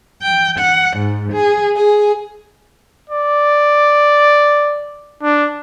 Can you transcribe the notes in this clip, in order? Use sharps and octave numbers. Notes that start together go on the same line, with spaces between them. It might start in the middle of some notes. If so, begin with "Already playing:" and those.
G5
F#5
G#2
G#4
G#4
D5
D4